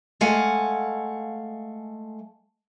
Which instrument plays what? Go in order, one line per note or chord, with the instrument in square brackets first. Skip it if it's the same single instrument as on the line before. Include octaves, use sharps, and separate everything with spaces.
[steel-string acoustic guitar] G#3 A3 F5 F#5 G#5